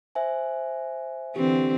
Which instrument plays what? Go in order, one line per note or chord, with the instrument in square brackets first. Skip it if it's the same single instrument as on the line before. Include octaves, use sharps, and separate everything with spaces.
[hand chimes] C5 E5 G#5
[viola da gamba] D3 E3 C4 [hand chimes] G4